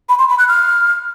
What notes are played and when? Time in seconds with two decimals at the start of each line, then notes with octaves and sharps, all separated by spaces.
0.09 B5
0.19 C6
0.29 B5
0.39 F#6
0.48 F6